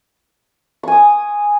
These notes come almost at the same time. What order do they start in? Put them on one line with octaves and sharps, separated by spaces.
C#6 G#5 D#6